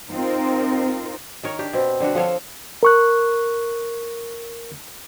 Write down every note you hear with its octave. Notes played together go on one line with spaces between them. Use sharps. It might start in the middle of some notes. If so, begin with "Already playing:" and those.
C4 D#4 F4 A#4
D#3 A#4 C#5
D4 G4
B2 C4
D3 G3 D4 F#4
F3 A4 C#5 F5
A#4 C#6 F#6